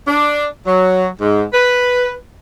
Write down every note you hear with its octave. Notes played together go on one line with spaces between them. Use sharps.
D4
F#3
G#2
B4